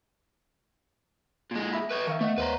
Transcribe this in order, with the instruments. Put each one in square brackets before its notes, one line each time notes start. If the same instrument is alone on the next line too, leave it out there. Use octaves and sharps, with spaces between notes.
[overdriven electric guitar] A#2 G#3
[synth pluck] E5 B5
[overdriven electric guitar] B4 C#5
[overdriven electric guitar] D#3 [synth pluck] E5 F5 C#6
[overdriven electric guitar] A3 [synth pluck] B3 D#5 F#5
[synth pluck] D#2 A#5 [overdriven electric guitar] B4 C5